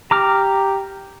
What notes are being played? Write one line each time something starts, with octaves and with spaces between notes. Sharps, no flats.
G4 A#5 D6 F6